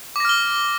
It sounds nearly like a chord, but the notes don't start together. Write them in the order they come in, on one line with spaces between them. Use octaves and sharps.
D6 A#6 F6 G7